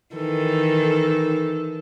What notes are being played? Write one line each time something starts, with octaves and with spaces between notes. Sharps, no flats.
D#3 E3 A4